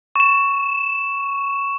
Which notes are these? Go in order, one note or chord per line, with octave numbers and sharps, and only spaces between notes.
C#6 E7